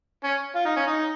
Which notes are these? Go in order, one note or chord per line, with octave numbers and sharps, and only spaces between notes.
C#4
F4
D#4
C#4
D#4